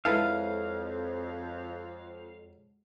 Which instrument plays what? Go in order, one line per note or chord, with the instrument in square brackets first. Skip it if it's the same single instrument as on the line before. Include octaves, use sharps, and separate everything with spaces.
[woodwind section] F2 [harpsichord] F#3 G#3 [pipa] E4 A4 B4 [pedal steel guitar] F5